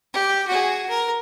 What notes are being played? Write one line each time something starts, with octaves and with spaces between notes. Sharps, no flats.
G4
F#4 G#4
A#4